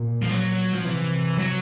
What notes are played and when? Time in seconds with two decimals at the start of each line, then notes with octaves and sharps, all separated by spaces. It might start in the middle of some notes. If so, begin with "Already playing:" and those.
Already playing: A#2
0.22 F3
0.29 F#3
0.73 F3
0.83 C3 E3
1.38 F#3